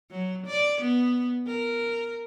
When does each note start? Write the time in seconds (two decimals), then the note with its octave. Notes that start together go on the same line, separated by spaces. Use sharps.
0.11 F#3
0.46 D5
0.81 B3
1.47 A#4